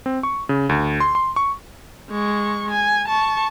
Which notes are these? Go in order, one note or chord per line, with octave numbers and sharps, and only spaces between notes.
C4
C#6
C#3
D2
C6
C6
C#6
G#3 C#6
G#5
A5 C#6